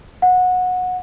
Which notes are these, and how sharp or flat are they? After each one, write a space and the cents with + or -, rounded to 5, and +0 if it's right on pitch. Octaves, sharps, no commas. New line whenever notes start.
F#5 -20